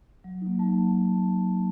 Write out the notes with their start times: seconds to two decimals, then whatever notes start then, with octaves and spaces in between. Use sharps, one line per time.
0.24 F#3
0.42 A#3 D#4
0.59 F#3 A5